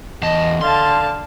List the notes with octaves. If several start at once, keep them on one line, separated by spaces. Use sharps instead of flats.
E2 D#5 A5
D3 F5 A5 C6